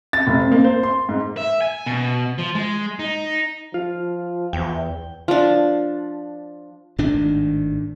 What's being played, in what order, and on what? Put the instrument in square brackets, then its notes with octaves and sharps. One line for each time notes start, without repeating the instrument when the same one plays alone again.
[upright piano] A6
F1
C4
A#3
C5
C6
G#2
[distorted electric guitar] E5
G#5
B2
F3
G#3
D#4
[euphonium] F3 [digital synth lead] F4
[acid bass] E2 [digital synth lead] G5
[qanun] F3 D4
[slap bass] G#1 A2 D#3 D4